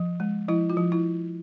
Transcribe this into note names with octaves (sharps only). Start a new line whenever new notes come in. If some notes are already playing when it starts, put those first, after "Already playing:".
Already playing: F3
G#3
F3 E4
F4
F3
E4